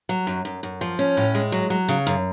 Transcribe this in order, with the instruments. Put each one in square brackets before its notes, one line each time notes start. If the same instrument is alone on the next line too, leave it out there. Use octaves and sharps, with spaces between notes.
[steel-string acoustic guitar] F#3
F#2
F#2
F#2
F3
C#4
A2
G#3
F#3
F#3
C#3
F#2